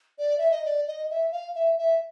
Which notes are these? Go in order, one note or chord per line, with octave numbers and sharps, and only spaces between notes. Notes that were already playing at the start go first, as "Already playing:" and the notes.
D5
E5
D#5
D5
D#5
E5
F5
E5
E5